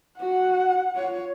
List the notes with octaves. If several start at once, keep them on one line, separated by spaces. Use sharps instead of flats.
F#4 F#5
F4 C#5